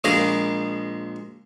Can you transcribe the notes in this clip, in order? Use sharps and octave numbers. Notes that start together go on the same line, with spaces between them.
A#1 G#3 A#4 D#5 F5 D6